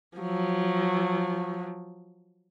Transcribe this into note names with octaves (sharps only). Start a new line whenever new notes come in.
F3 F#3